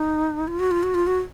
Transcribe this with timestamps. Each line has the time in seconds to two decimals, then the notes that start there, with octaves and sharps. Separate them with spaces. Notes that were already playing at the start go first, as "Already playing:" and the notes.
Already playing: D#4
0.48 F4
0.59 F#4
0.71 F4
0.83 F#4
0.94 F4
1.07 F#4